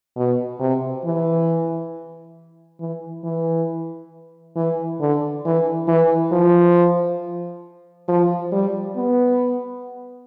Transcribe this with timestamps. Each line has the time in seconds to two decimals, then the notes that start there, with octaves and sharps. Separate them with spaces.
0.17 B2
0.60 C3
1.05 E3
2.80 E3
3.24 E3
4.56 E3
5.01 D3
5.45 E3
5.88 E3
6.32 F3
8.08 F3
8.52 G3
8.96 B3